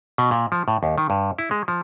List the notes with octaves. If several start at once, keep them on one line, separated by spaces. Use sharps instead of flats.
B2
A#2
F3
A2
D#2
D#3
G2
E4
G#3
F3